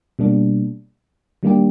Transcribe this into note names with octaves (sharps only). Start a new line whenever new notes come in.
B2 G3 A#3 D4
D#3 G3 A#3 D4 G4